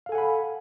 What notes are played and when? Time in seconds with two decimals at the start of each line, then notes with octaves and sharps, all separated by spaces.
0.06 F5
0.09 A4
0.12 G#5
0.15 F#5
0.18 B5